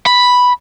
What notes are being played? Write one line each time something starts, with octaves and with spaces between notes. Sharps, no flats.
B5